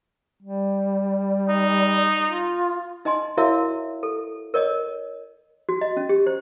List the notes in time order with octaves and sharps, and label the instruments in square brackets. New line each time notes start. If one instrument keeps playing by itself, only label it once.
[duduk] G3
[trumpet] D#4
[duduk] F4
[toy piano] D#4 D#5 G#5 C6
E4 F#4 A#4 C#5 E5 F5
A4
A#4 C#5 D#5
F#4
D#5
C#4
G4
C5